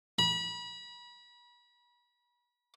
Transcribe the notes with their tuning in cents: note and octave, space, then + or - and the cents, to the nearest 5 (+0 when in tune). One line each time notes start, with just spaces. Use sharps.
B5 -35